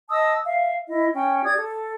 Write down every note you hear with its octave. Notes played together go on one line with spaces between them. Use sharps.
D#5 A5 D#6 E6
E5 F5
E4 D#5
C#4 G5
G4 D5 D#6 G#6
A4